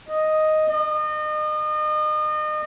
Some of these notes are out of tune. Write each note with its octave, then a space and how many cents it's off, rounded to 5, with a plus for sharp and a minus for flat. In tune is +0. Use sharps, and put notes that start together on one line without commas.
D#5 +0
D#5 -35